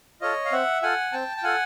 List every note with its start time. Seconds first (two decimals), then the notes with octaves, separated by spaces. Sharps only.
0.21 F4 A4 C#5 D#5
0.45 F5
0.52 C4 E5 F#5
0.82 F4 A4 F#5 G#5
1.12 C4 G5 A5
1.37 G5
1.43 F4 A4 F#5 G#5